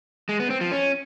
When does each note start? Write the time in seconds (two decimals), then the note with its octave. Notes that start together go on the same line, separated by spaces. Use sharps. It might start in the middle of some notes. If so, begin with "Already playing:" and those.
0.29 G#3
0.39 B3
0.50 C4
0.61 F3
0.72 C#4